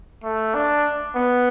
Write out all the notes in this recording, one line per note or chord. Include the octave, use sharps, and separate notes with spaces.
A3
D4
B3